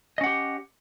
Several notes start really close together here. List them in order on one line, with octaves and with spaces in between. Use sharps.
D#5 C#4 F#5 G4